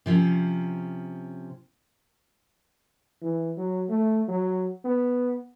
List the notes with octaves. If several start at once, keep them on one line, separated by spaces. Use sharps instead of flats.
C3 F3 C#4
E3
F#3
A3
F#3
B3